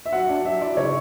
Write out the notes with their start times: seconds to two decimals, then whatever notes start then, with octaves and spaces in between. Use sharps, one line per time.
0.06 E5
0.12 F#3 F#5
0.29 D4
0.45 F#3 E5
0.61 E4 D5
0.77 C#3 C#5